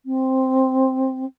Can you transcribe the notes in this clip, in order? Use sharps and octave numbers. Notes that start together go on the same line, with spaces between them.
C4